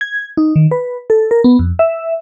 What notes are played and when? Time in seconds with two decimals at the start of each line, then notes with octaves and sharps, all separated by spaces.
0.01 G#6
0.37 D#4
0.56 D#3
0.71 B4
1.10 A4
1.31 A#4
1.44 B3
1.59 F2
1.79 E5